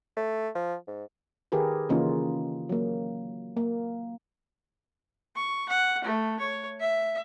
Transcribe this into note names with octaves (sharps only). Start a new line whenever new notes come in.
A3
F3
G#2
D#3 G4 G#4 A#4 B4
C#3 E3 A#3 C#4 D#4 F4
F#3 A#3
A#3
C#6
F#5
A3
C#5
E5